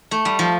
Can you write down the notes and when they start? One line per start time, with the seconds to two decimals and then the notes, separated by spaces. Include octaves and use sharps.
0.11 A3
0.25 G3
0.39 F3